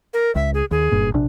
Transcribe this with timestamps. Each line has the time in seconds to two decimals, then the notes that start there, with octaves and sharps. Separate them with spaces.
0.14 A#4
0.35 C#2 E5
0.54 G#4
0.71 D#2 G#4
0.91 F#1 G2 A#2
1.14 A#1 C3 D4